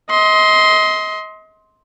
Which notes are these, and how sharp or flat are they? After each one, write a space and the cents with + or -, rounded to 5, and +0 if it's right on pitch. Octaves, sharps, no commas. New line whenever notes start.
D#5 +35 C6 +0